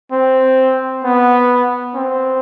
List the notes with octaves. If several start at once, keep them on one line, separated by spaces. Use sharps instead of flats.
C4
B3
C4